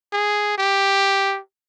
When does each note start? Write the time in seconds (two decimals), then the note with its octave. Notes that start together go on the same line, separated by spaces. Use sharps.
0.13 G#4
0.58 G4